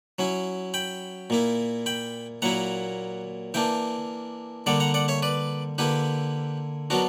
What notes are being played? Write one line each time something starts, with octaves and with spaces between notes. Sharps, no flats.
F#3 C#4 E4
G5 B5
A#2 A#3 E4
G5 B5
A#2 F#3 A#3 E4 F#5 A#5
E3 A#3 D4 E5 G5
D3 G3 A#3 D5 F#5
F#5 A#5
D5 F#5
C#5 E5
B4 D5
D3 A#3 E4 G4 B4
F#3 B3 D4 F#4 A#4